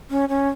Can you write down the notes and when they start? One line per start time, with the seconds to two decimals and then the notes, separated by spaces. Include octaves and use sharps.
0.10 C#4
0.29 C#4